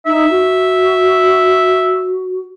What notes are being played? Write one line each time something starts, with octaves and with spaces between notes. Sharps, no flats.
D#4 E5
F#4